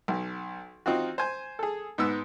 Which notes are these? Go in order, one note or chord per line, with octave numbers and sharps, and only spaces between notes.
B1
C4 D#4 F4 F#4
C5 G#5
G#4 A4
G#2 B3 E6